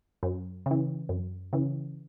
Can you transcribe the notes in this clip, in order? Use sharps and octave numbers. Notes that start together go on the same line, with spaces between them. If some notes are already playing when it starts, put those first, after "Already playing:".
F#2
C#3 E3
F#2
C#3 E3